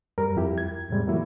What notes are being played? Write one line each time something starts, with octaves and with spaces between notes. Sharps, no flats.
F#2 G3 A#4
F2 E4 G4
G#6
F2 A2 C3 G3 G#3
E3 F#3 A3 A#3 E4